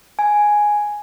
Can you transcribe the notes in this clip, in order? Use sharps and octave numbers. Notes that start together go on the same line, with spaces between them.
G#5